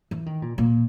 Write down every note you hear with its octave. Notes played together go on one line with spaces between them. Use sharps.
E3
D#3
A#2
A#2